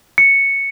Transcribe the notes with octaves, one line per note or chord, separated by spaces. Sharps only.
C#7